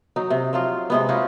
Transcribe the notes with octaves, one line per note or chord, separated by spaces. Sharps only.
F#3 D#4
C3
F3 F#3 F4
C3 G#3 B3
C#4 D#4 F4 F#4